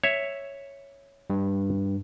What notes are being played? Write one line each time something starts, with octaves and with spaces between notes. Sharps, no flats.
C#5 E5
G2